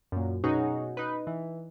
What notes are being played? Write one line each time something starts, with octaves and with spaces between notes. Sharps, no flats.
F#2 A#2
B2 C#4 D#4 F#4 G#4
D#4 B4
E3